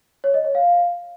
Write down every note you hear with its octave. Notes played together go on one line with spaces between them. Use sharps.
C#5
D#5
C#5
F5